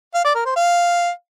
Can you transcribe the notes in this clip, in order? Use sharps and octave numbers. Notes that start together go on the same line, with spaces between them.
F5
D5
A#4
C5
F5